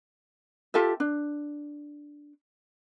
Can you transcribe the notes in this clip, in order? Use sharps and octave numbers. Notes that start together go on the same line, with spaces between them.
F4 G4 A4 E5
D4